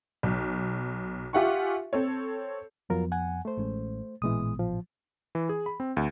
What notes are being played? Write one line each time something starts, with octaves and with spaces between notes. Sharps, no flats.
B1
F4 G4 E5 F#5 G#5 C#6
C4 A4 C#5
F2 F3 F#3 B3 F4 A#4
F#5 G#5
A3 C5
A1 G#3 C#4
A1 A#2 E3 G#3 B3 D#6
F3
E3
G#4
B5
C4
D2